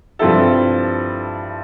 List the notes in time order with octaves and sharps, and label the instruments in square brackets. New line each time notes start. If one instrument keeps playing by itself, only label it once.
[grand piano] G2 F3 C4 E4 A4